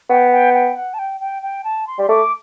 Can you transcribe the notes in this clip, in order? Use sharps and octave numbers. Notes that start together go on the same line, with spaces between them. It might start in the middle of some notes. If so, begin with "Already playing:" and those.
B3 G5
G5
G5
F#5
A5
G5
G5
G5
A5
C6
G3 C6
A3 D6